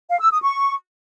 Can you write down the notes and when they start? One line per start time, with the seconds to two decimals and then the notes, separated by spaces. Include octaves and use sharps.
0.09 F5
0.20 E6
0.32 D#6
0.43 C#6